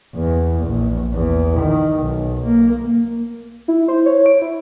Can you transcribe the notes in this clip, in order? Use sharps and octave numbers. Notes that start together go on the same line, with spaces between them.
E2
A#1
E2
D#3
B1
A#3
E4
C5
C#5
D7
E4